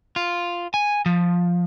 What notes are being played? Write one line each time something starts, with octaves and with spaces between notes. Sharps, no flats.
F4
G#5
F3